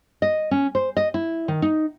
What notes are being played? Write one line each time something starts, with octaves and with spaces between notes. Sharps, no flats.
D#5
C#4
C5
D#5
E4
D#3
D#4